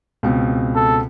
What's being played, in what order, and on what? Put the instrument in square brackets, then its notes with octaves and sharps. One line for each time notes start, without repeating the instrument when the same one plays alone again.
[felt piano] C#2 B2 C4
[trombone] A4